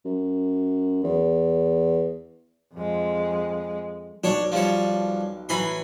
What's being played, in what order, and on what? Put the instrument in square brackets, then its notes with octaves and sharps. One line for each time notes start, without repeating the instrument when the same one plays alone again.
[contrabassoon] F#2
E2
[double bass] F2 G#3
[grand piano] B1 [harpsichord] D4 C#5
[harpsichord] F3 G3 C#5
[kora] A2 E3 F#3 [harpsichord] G#5 B5 C6